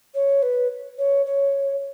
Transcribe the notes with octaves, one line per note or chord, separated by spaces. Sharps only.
C#5
B4
C#5
C#5